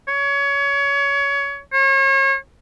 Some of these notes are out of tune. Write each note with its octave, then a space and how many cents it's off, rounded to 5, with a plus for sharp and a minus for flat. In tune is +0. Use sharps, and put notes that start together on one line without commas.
C#5 +25
C#5 -40